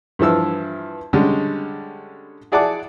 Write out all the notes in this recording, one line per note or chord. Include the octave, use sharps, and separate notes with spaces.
G2 E3 F3 E6
D3 G3 G#3 C#4
E4 G#4 D5 F#5 A5 D6